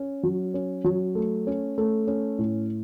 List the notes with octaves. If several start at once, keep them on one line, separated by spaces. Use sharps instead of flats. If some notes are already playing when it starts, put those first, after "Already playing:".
Already playing: C#4
F#3
C#4
F#3
A3
C#4
A3
C#4
A2